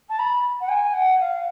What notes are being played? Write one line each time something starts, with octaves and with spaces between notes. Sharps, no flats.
A5
B5
F#5
G#5
F#5
F5